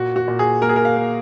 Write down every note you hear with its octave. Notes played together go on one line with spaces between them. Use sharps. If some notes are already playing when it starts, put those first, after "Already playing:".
Already playing: A#2 F#4
F#4
A#2
G#4
A#3 A#4
G#4
A#4
F5
A#3